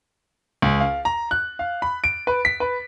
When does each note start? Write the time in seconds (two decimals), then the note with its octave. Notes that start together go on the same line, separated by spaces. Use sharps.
0.62 C#2
0.81 F5
1.05 A#5
1.31 F#6
1.59 F5
1.82 B5
2.04 D7
2.27 B4
2.45 B6
2.60 B4